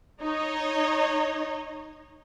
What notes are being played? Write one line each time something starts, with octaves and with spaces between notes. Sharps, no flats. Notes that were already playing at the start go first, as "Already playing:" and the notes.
D#4 C#5 D#5